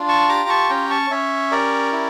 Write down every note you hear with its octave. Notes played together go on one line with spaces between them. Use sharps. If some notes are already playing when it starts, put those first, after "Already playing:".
Already playing: D4 F4
A5 C#6
G4 A#5 D6
A5 C#6
C#4 G5 A#5
A5 C#6
C#4 C#5 E5
G4 A#4 D5
E4